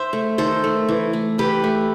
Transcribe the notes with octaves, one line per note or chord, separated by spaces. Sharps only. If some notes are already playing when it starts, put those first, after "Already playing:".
Already playing: C5 E5
A3
D#3 A4 C5
A3
E3
A3
E3 G4 B4
A3